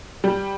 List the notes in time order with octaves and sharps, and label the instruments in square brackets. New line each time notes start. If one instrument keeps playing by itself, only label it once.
[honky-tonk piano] G3